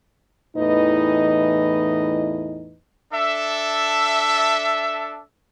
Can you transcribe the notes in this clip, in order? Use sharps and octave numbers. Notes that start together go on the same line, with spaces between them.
E2 A2 E3 D#4 B4 D#5
D4 A4 E5